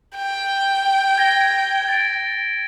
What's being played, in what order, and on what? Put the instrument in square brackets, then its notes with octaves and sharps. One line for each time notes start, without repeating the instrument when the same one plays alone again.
[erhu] G5
[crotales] G#6 A#6 G7
A6 D7